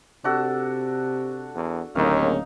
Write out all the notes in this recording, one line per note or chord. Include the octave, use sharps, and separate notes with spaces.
C3 D4 F#4 A4
E2
D1 D#2 C#3 A#3 C#4 D#4 F5